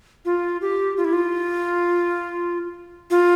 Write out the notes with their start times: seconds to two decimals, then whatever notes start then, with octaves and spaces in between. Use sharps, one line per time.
0.25 F4
0.61 G4
0.97 F4
1.04 E4
1.13 F4
3.11 F4